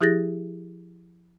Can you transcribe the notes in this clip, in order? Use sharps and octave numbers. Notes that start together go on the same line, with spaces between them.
F3 E4 G4 G#4 A6 A#6